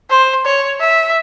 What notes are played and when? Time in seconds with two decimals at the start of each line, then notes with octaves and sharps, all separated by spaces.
0.10 C5
0.45 C#5
0.80 E5